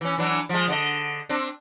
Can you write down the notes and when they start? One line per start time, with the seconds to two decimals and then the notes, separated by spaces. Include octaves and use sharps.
0.01 E3 C#4
0.18 E3 F#3 D4
0.49 F3 G#3
0.68 D3 C#4 D#5
1.29 C4 D4